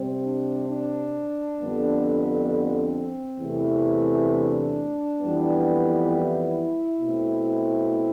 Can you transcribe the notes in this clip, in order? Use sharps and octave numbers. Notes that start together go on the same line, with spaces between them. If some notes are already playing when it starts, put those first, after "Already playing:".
Already playing: C3 G3 C4
D4
D4
F2 D3 G3 B3
C4
E2 C3 E3 A3
D4
F2 E3 G3 B3
E4
B2 A3 C4